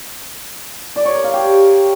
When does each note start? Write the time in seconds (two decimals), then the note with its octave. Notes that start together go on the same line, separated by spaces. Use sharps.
0.96 D5
1.05 C#5
1.15 A#4
1.24 F5
1.34 G4